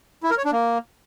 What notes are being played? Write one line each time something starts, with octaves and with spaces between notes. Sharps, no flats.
E4
A#4
C#5
D4
A#3